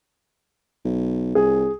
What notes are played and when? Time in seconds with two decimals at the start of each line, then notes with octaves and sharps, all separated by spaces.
0.85 B1
1.35 C2 G#4